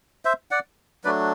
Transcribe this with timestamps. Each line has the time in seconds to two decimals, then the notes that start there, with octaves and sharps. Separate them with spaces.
0.25 C5 E5
0.51 D5 F#5
1.04 F#3 A3 D4 B4 D5